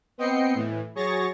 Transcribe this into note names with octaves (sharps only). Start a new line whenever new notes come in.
B3 C4 D#5 G5 C7 C#7
A2 E3
F#3 G#4 C#5 C#6 A6 A#6